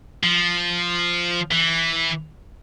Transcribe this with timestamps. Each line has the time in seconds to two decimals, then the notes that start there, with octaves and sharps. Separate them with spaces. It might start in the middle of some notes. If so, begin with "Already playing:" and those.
0.23 F3
1.51 E3